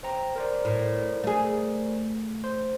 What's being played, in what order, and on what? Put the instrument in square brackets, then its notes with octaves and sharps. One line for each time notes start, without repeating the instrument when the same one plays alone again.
[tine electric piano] C5 G5 A#5
A#4 C5 D5
[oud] A2
A3 G#4
[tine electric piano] C5